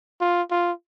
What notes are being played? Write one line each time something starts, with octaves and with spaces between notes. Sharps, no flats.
F4
F4